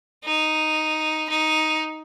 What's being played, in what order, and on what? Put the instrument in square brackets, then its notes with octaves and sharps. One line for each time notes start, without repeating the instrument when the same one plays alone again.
[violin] D#4
D#4